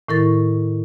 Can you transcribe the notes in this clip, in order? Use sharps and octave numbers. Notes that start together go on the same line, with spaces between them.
A2 D#3 E4 A#4 C#6 A6